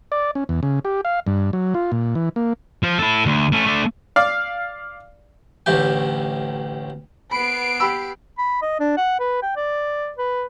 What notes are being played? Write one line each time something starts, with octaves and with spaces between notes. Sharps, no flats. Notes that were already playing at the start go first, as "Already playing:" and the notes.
D5
C#4
E2
C#3
G4
F5
G2
F#3
F4
A#2
E3
A#3
F3
E4 A4
D2
A3 C#4
A3 D4
D5 F5
A1 D2 A2 G4 G5
B3 B5 C7 D7
G4 B5 E6
B5
D#5
D4
F#5
B4
G5
D5
B4